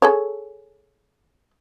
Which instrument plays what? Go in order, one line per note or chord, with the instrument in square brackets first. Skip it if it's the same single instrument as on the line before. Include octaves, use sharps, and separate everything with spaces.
[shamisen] G#4 A4 C#5